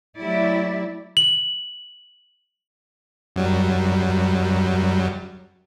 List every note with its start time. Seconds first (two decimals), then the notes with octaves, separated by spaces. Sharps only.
0.19 F#3 A3 E4 G4 D5 E5
1.17 F#7
3.36 F#2 F#3 G3